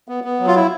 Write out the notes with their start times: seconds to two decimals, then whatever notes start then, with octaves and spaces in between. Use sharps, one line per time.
0.08 B3
0.24 B3
0.40 F#3
0.47 F4
0.56 E4